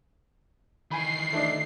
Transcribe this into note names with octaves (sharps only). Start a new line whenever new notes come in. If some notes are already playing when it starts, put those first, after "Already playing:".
D#3 E3 G#5 B5 C7
A3 D4 D#4